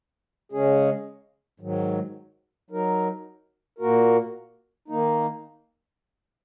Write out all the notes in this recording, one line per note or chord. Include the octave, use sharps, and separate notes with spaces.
C#3 G#3 C#4 G#4
G#2 D#3 F#3
F#3 D#4 A#4
A#2 A#3 F#4 A#4
D#3 A#3 D#4